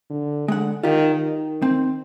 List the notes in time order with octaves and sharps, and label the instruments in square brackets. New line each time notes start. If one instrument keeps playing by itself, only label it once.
[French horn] D3
[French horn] D3 [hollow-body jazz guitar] G#3 F#5
[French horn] D#3 [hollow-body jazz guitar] F4 G4
[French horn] D#3
[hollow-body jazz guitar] C4